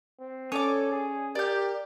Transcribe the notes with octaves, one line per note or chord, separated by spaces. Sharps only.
C4
C#4 A4 C#5 D5 D6
G#4
G4 A#4 D5 G6